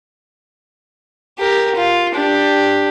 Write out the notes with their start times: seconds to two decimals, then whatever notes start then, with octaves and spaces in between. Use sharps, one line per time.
1.39 G4 A#4
1.75 F4
2.14 D4 G4